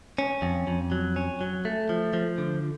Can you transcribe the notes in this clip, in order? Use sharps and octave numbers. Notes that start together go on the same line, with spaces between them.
C#4
F2
F2
F#3
C#4
F#3
A3
F3
F3
D3